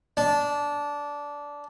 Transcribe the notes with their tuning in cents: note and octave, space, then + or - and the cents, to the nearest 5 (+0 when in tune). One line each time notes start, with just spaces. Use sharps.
D4 -15